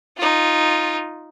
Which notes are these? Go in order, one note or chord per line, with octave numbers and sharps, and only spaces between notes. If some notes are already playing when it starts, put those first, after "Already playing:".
D#4 F4